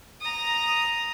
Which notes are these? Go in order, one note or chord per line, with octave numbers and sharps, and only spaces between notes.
A#5 D#6